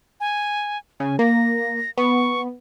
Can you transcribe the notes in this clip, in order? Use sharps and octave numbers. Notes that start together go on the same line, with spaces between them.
G#5
C#3 G#5
A#3 A#6
B3 C#6